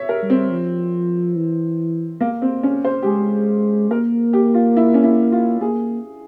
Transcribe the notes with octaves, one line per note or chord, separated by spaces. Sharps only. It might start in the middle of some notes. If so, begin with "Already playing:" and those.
Already playing: C#5 E5
A#4
G3
C4
F3
E3
A#3
C4
C#4
C5
G4
G#3 G#4
A#3 A#4
G4
F4
E4
C#4
E4
F4
A#3 G#4